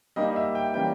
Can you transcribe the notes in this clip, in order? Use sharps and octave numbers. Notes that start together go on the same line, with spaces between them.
G3 A#3 D#4 D#5
E5
G5
E3 G3 A#3 C#4 G5